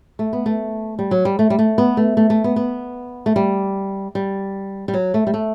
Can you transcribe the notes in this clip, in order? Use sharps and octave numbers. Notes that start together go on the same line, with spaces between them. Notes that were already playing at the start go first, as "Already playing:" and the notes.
A3
B3
A3
G3
F#3
G3
A3
G3
A3
B3
A3
A3
A3
B3
B3
A3
G3
G3
G3
F#3
A3
G3
A3